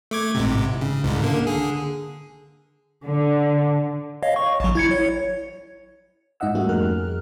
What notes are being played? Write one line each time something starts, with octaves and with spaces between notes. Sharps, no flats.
A3 D6 G#6
A1 G#2 C3
C#3
C2 G#2 C#3
D3 A#3
D3 G#4
D3
C#5 D#5 F5
C#6
A1 F#3
E4 G#6 C#7
C#5
G#2 D#4 D#5 E5 F#5 E6
G3 A3 A#3 C#4 F#4 G4
F2 G#4 A#4 F6 F#6